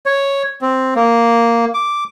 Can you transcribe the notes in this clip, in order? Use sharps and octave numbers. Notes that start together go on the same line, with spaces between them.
C#5
C4
A#3
D6